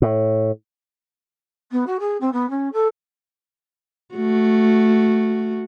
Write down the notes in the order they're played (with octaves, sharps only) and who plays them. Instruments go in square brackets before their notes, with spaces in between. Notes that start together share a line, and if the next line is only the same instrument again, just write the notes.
[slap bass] A2
[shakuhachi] B3
F#4
G#4
C4
B3
C#4
A4
[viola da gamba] A3 F#4